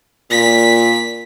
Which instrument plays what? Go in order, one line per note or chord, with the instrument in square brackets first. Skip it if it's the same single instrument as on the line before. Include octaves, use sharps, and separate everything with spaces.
[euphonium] A#2 [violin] B6